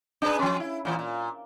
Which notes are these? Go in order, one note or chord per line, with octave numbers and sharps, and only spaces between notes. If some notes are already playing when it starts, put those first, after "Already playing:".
D4 G#4 B4
F3 C#4
E4
A#2 E3
A#2